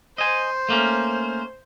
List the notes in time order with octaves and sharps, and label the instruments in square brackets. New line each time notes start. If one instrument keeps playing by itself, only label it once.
[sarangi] C5 [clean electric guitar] D#5 G#5
[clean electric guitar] A3 A#3 C#4